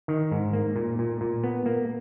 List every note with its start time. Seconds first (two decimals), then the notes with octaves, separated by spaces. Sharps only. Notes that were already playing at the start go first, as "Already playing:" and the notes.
0.08 D#3
0.31 G#2
0.53 A#3
0.76 A#2
0.99 A#2
1.21 A#2
1.44 B3
1.66 A#3